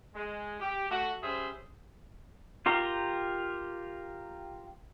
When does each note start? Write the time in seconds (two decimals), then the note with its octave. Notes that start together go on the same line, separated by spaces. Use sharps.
0.15 G#3
0.60 G4
0.90 A3 F#4
1.22 G3 C#4 G#4 C5 E5
2.66 F4 G4 A#4